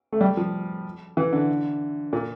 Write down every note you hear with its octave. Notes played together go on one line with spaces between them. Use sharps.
A3
G3
F3
E3
D3
A#2